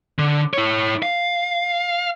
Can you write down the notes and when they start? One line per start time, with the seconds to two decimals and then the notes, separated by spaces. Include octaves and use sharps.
0.19 D3
0.54 E4 C#5
1.02 F5